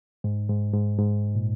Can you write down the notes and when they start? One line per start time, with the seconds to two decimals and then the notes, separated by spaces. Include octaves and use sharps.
0.24 G#2
0.49 G#2
0.74 G#2
0.98 G#2
1.35 A#2